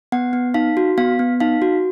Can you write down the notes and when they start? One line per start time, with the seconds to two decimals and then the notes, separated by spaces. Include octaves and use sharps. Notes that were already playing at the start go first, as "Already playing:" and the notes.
0.12 B3 F#5
0.33 B3
0.54 D#4 F5
0.77 F#4
0.98 B3 F5
1.19 B3
1.40 D#4 F5
1.62 F#4